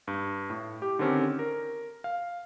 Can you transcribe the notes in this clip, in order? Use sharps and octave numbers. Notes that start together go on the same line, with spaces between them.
G2
A2
G4
D3 D#3 C4 C#4 G4
A#4
F5